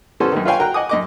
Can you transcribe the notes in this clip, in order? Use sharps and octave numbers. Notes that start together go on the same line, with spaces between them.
E3 G3 B3 C#4 A4 C5
F#2 D#3
F4 B4 C#5 F5 G5 G#5
F#4 A#4 G5 A#5 F#6
D#5 F#5 G#5 D6 D#6
F#2 D#5 D6